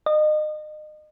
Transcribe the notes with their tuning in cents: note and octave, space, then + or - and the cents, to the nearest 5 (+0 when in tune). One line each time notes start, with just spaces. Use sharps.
D#5 -30